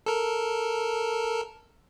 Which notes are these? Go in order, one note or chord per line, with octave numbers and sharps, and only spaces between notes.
A4 A#4